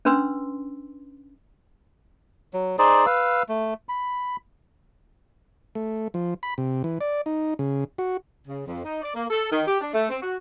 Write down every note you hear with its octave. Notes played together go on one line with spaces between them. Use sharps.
C#4 D4 B4 C6 E6
F#3
D#4 G#4 C5 D5
B4 F5 E6
A3
B5
A3
F3
B5
C3
E3
D5
D#4
C#3
F#4
C#3
F2
D#4
D5
A#3
A4
D#3
G4
D4
A3
C4
F#4